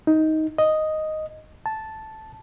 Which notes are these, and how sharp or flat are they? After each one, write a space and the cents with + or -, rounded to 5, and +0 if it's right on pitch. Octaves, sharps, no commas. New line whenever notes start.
D#4 +15
D#5 +0
A5 -5